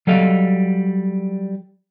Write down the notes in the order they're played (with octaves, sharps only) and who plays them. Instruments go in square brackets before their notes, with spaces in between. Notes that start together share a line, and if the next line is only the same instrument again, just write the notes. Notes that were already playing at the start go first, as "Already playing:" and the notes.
[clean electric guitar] F#3 G3 A4 D#5 F5